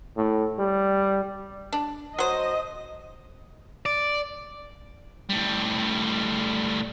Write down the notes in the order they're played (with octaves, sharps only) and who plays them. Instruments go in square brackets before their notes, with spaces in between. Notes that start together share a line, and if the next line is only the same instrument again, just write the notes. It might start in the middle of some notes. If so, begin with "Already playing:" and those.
[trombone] A2
G3
[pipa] D4
[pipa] F#3 C5 [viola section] D#5
[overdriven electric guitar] D5
[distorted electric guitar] A2 G3